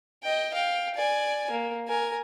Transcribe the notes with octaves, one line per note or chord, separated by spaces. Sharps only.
D#5 G5
F5 G5
D5 G#5
A#3
A#4 G#5